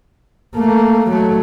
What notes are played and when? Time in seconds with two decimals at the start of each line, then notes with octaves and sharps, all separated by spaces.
0.56 A3 A#3
1.11 F#3 A3